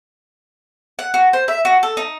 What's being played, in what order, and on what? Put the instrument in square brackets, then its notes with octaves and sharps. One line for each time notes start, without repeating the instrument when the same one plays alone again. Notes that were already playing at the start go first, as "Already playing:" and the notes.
[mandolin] F#5
F#4
C5
E5
F#4
A4
D#4